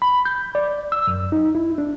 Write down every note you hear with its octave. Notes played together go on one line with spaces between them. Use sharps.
B5
G6
D5
E6
F#2
D#4
E4
D4